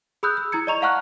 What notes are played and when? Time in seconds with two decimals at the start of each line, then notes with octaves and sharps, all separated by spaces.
0.23 G#4 B5 D#6 E6 F#6 G6
0.37 E6
0.52 E4 A#5 G#6 C#7
0.67 D5 D#5 A#5 C#6 F7
0.82 F5 F#5 A5 C#6 F6 F#6